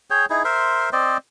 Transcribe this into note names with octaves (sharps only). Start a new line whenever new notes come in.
G#4 C#5 G5
D#4 E4 G#4
A#4 C5 E5 C6
C4 C5 D5 D#5